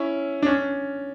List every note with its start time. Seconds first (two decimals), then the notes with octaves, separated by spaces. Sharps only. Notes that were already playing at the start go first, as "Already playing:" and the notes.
Already playing: C#4 E4
0.42 D4
0.46 C#4